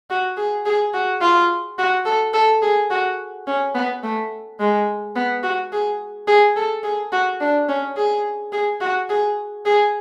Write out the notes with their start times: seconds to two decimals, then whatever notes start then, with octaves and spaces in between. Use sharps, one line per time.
0.10 F#4
0.37 G#4
0.66 G#4
0.94 F#4
1.21 F4
1.79 F#4
2.06 A4
2.34 A4
2.62 G#4
2.90 F#4
3.47 C#4
3.74 B3
4.04 A3
4.60 G#3
5.16 B3
5.43 F#4
5.72 G#4
6.27 G#4
6.56 A4
6.83 G#4
7.12 F#4
7.41 D4
7.69 C#4
7.97 G#4
8.53 G#4
8.81 F#4
9.10 G#4
9.65 G#4